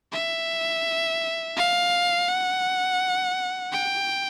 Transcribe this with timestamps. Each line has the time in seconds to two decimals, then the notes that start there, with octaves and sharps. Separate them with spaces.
0.12 E5
1.57 F5
2.29 F#5
3.72 G5